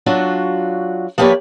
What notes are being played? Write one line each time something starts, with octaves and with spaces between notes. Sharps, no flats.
F#3 D4 F4 F#4
F3 A#3 G4 B4 C#5 D5